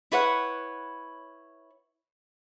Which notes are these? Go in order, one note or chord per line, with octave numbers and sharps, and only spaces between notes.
E4 B4 C#5 F#5